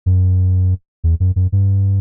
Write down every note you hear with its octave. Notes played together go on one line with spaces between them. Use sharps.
F#2
E2
F#2
F#2
G2